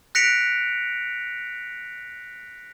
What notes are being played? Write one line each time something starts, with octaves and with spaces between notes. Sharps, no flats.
F#6 A#6 B6 C#7 D7 F7